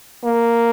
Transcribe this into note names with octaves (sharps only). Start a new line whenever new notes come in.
A#3